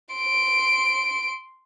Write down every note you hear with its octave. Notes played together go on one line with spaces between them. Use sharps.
C6 D7